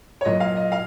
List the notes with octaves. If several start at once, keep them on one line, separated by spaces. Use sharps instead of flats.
C#5
A#2 F#3 D#5
F5
D#5
F5